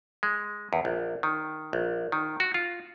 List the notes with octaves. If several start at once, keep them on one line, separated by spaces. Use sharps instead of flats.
G#3
E2
A#1
D#3
A#1
D#3
F#4
F4